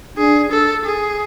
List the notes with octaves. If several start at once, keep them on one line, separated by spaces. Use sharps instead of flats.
D4 G#4
A4
G#4